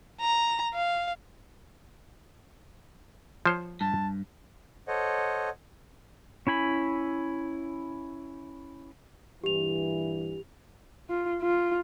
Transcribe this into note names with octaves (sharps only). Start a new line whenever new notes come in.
A#5
F5
F3 C5 C#5
G2 A5
A4 C5 C#5 D#5 F#5
C#4 E4 G#5 B5
G2 A#2 E3 G4 F7
F4
F4